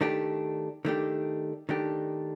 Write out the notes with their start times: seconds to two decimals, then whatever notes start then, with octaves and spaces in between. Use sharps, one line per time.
0.01 D#3 A3 D4 G4
0.85 D#3 A3 D4 G4
1.69 D#3 A3 D4 G4